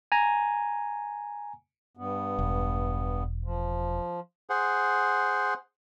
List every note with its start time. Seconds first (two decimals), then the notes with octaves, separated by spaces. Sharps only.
0.12 G#5 A#5
1.97 G2 B3
2.39 E1
3.44 F3
4.50 G#4 C5 F#5